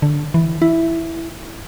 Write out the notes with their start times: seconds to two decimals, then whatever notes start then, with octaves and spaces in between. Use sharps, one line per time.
0.02 D3
0.34 E3
0.62 E4